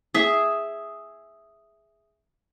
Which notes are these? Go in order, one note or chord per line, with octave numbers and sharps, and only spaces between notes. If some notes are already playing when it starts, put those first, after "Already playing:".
G#4 E5